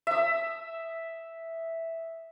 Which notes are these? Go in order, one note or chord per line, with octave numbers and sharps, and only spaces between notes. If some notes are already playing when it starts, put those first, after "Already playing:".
E5 D#6